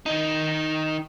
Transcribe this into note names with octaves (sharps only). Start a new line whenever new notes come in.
D#3 D#4